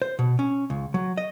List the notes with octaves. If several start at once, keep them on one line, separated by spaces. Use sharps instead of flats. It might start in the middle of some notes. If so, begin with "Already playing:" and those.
C5
B2
C#4
C#2
F#3
D#5